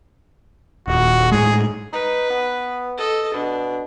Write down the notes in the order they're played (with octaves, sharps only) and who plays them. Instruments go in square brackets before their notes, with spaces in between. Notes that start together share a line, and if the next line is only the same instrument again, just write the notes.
[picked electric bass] D#1 [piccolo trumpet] F#4
[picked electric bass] A2 G#3 [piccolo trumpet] G#4
[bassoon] D#4 [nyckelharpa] B4
[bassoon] B3
[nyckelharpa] A4 D#5
[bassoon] B2 [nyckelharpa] D4